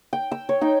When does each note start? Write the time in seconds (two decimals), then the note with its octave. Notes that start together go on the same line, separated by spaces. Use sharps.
0.13 G5
0.31 E6
0.49 C#5
0.61 D#4 G5